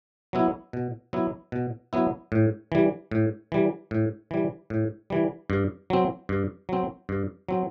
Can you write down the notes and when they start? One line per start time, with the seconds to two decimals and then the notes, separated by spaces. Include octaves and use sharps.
0.33 F#3 B3 E4
0.73 B2
1.13 F#3 B3 E4
1.52 B2
1.93 F#3 B3 E4
2.32 A2
2.72 E3 G3
3.11 A2
3.52 E3 G3
3.91 A2
4.31 E3 G3
4.70 A2
5.10 E3 G3
5.50 G2
5.90 F#3 C4
6.29 G2
6.69 F#3 C4
7.09 G2
7.49 F#3 C4